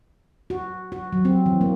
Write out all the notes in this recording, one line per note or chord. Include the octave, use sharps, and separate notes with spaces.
F#4
F#4
F#3
C4
E3
A#3